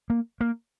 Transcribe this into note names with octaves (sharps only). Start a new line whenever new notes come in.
A#3
A#3